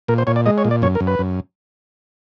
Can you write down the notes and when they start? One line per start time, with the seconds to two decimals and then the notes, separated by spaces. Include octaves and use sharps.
0.08 A#2 A#4
0.18 C5
0.27 A#2 C#5
0.36 D5
0.46 G#3 D#5
0.58 C#5
0.65 A#2
0.71 D5
0.82 F#2 C#5
0.95 A#4
1.00 F#2
1.07 B4
1.19 F#2